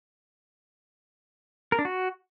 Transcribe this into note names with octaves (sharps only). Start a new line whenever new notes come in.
A#4
D4
F#4